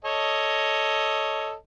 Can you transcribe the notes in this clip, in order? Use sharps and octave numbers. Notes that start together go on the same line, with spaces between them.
A4 C#5 D#5